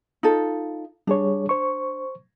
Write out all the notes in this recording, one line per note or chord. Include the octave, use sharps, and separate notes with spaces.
D#4 F4 A4
G3 D4 G#4 C#5
C5 C#6